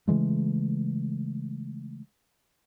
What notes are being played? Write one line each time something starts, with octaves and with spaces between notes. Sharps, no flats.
C#3 E3 G#3 A3